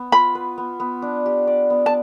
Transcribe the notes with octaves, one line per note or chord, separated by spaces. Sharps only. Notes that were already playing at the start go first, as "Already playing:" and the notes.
Already playing: B3
F4 B5
B4
B3
B3
D4
G4
D5
B3
A5